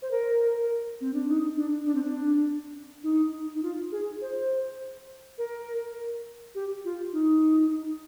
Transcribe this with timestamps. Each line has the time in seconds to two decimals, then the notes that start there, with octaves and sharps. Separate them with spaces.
0.02 C5
0.11 A#4
1.01 C4
1.14 D4
1.28 D#4
1.57 D4
1.86 D4
1.95 C4
2.03 D4
3.03 D#4
3.55 D#4
3.63 F4
3.92 G#4
4.21 C5
5.38 A#4
6.55 G4
6.85 F4
7.13 D#4